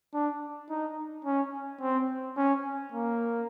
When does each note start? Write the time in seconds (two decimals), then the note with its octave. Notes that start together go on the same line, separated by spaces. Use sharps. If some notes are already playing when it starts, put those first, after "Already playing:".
0.14 D4
0.70 D#4
1.25 C#4
1.81 C4
2.37 C#4
2.92 A#3